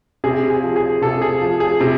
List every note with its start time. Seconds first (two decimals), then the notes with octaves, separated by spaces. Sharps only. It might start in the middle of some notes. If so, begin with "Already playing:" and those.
0.24 C3 G#4
0.50 G#4
0.63 F3
0.76 G#4
1.01 C3 A4
1.22 G#4
1.41 F3
1.60 G#4
1.80 C3